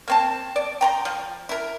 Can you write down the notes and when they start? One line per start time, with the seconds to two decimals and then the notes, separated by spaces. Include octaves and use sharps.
0.08 A#3 C4 A5
0.56 D5
0.81 G5 A#5 C6
1.05 F3
1.49 E4 A#4